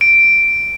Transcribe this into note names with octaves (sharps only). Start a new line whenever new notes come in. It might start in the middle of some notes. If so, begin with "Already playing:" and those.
D7